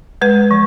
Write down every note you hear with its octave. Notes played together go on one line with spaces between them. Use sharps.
G#3 B4
F3